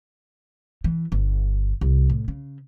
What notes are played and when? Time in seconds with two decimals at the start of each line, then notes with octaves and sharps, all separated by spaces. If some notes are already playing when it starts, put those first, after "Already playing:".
0.84 E3
1.12 G1
1.81 C2
2.10 A2
2.28 C#3